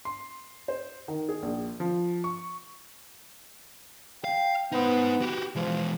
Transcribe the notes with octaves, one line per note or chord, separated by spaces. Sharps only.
C6
C5
D#3
G#4
A#1
F3
C#6
F5 G5
B3 D#4 C5
F#4 G4
E3 F3 G#3